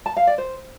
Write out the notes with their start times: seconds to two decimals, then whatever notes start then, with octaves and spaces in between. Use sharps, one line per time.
0.06 A5
0.16 F5
0.27 D5
0.38 C5